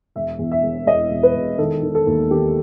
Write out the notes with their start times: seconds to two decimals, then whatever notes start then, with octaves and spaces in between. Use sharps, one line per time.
0.15 E1 E5
0.39 E2
0.52 E5
0.63 E1
0.87 E1 D#5
1.11 E1
1.23 B4
1.35 E1
1.58 D#3 A4
1.83 D#3
1.95 A4
2.07 D#2
2.31 D#3 G4